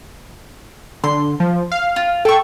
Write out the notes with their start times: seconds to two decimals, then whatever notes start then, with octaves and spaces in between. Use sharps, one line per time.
1.04 D3 C6
1.40 F3
1.72 F5
1.96 F4
2.25 A4 G5 C#6